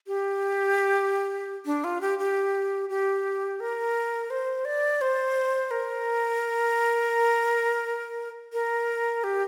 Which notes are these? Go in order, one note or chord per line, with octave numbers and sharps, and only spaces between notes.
G4
D4
F4
G4
G4
G4
A#4
C5
D5
C5
A#4
A#4
G4